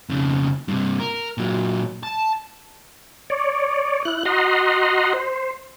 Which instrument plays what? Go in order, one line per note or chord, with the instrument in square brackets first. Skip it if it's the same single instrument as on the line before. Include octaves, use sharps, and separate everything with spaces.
[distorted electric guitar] F2 C#3
G2 C3
A#4
A#2 F#3
A5
[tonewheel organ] C#5 D5
E4 F#6
F#4 D#5 F#5 A#5 C6
C5